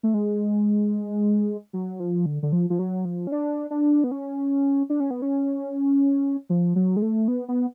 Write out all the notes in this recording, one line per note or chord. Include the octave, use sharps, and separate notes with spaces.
A3
G#3
F#3
F3
D3
D3
F3
F3
F#3
F3
C#4
D4
D4
B3
C#4
D4
C#4
B3
C#4
F3
F#3
G#3
A3
B3
B3